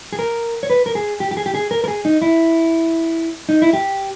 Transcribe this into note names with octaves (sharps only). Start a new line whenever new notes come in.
G#4
A#4
C#5
B4
A#4
G#4
G4
G4
G#4
G4
G#4
A#4
A#4
G#4
D#4
E4
D#4
E4
G4